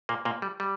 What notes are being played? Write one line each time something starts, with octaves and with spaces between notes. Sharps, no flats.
A#2 A#3
A#2 A#3
G3
G3